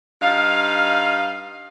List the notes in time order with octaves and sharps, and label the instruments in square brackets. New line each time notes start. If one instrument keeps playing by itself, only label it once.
[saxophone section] G2 D#4 F5